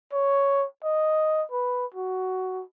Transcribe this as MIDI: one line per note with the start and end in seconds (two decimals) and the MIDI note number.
0.13 0.66 73
0.84 1.44 75
1.52 1.86 71
1.94 2.63 66